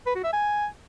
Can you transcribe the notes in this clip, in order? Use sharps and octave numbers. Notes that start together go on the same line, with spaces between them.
B4
F#4
E5
G#5